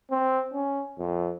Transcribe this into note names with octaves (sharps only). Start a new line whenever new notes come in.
C4
C#4
F2